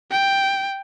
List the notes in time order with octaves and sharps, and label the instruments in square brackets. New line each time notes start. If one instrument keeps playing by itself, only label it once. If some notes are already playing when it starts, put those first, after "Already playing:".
[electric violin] G5